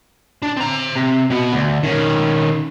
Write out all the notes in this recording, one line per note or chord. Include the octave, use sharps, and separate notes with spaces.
D4
C4 A#5
C3
B2 B3
D2
D#3 C#4